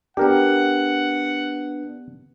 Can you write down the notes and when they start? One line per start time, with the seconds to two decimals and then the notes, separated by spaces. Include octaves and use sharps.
0.17 B3 D4 G4 A#4 F#5